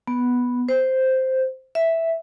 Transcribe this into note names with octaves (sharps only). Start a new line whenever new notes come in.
B3
C5
E5